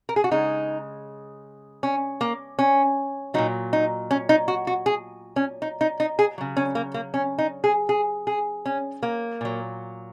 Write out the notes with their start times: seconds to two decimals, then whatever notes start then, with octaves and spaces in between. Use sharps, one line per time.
0.09 A#4
0.16 G#4
0.24 F#4
0.31 C#3 G#3 D#4
1.83 C#4
2.21 A#3
2.59 C#4
3.34 A#2 F#3 D#4
3.73 D#4
4.11 C#4
4.29 D#4
4.48 F#4
4.67 F#4
4.86 G#4
5.36 C#4
5.62 D#4
5.81 D#4
6.00 D#4
6.19 G#4
6.38 C#3 F#3
6.57 C#4
6.75 A#3
6.94 A#3
7.14 C#4
7.38 D#4
7.64 G#4
7.89 G#4
8.27 G#4
8.66 C#4
9.03 A#3
9.41 A#2 F#3